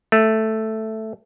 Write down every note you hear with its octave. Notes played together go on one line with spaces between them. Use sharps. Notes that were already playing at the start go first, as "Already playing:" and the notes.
A3